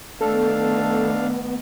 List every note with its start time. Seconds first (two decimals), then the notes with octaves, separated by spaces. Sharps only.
0.21 D#3 A3 B3 D4 A4 F5